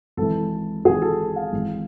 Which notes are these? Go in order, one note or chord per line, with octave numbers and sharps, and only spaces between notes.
G#1 G#2 E3 A4
G#1 G#2 E3 G#4
A4
F5
G#1 G#2 E3